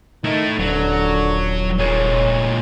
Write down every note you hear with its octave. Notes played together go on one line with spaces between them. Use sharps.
D#3 A3 D#4 E4
D#1 D3 F#3
A#2 G#3 C#5